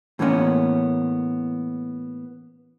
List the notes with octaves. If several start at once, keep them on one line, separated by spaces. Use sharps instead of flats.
A2 E3 A#3 B3 C#4